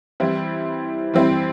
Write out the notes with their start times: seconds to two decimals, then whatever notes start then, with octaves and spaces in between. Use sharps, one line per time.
0.20 E3 G3 C4 E4
1.14 E3 G3 C4 E4